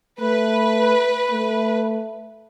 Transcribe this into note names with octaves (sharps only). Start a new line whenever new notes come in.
A3 B4
A3